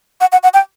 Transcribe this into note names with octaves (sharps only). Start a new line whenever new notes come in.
F#5
F#5
F#5
G5